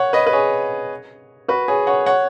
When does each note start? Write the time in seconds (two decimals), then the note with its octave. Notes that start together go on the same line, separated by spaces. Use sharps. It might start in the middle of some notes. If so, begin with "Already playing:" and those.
Already playing: C#5 F#5
0.13 B4 D#5
0.27 B4
0.33 G#4 C#5
1.48 F#4 B4
1.68 G#4 C#5
1.87 C#5 F#5
2.06 C#5 F#5